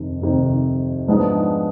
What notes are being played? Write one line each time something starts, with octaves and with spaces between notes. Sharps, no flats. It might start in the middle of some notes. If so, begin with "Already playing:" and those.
Already playing: F2 C3 D#3
F2 C3 D#3
G#2 F3 G#3 B3 D4